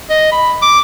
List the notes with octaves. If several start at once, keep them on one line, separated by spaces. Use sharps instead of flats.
D#5
B5
D6